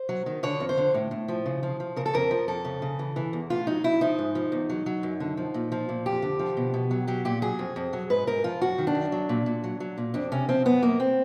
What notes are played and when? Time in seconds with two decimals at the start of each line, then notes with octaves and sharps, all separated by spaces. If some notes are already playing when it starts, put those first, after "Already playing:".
Already playing: C5
0.09 F#3
0.26 D#3
0.43 D3 C#5
0.60 F2
0.69 C5
0.77 D3
0.94 A2
1.11 A2
1.28 F3
1.46 C#3
1.63 F3
1.80 F3
1.96 C#3 A#4
2.06 A4
2.14 F2 A#4
2.31 F3
2.48 F2 A4
2.65 C#3
2.82 C#3
2.99 E3
3.16 E3
3.33 E2
3.50 A2 F4
3.67 F#3 D#4
3.84 F#3 E4
4.01 F3 D#4
4.18 G#2
4.35 F3
4.52 E2
4.70 F#3
4.86 F#3
5.03 F#2
5.20 D3
5.37 F3
5.54 A#2
5.72 F3
5.89 A#2
6.06 F2 G4
6.22 D3
6.39 F3
6.57 B2
6.74 B2
6.91 F#3
7.07 F#3 G4
7.25 A#2 G4
7.42 F#3 G#4
7.59 F2
7.76 F2
7.93 F#3
8.10 G#2 B4
8.27 G#2 A#4
8.44 F3 F4
8.61 F#2 F#4
8.78 D#3
8.87 D4
8.95 F#2
9.12 F#3
9.29 A#2
9.46 A#2
9.64 F#3
9.80 F#3
9.98 A#2
10.14 F2 D4
10.32 C3 C#4
10.49 F3 C4
10.65 F#2 B3
10.82 F#2 A#3
11.00 C4